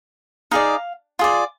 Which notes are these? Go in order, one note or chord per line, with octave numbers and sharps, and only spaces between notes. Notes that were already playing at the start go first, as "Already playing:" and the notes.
D#4 G#4 D5 F5
F4 G#4 D5